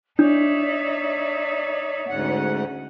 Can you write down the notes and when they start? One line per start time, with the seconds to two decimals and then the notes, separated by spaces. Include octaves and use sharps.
0.19 D4 D#4 C#5 D5 E5
2.09 D2 G#2 C#4 F#5